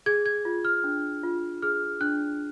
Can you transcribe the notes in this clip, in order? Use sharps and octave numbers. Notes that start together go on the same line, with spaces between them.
G#4 G#6
G#6
F4
F6
D4
F4
G#4 F6
D4 F#6